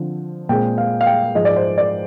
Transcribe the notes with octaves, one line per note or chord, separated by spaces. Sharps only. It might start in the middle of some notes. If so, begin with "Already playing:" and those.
Already playing: D3 F3 C4
A#2 G#3 C4 G5
F5
F5
G5
G#2 F3 G#3 D#5
D5
C5
D5